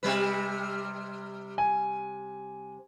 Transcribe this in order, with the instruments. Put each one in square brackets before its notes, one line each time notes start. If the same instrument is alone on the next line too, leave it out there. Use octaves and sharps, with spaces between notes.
[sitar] C3 G3 B4
[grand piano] G#5